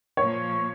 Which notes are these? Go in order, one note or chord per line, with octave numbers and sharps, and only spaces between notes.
A#2 F3 A#3 C#5